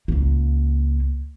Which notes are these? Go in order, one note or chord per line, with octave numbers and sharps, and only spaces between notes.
C#2 A#3